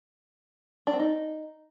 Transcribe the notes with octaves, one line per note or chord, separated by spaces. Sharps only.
D4
C4
D#4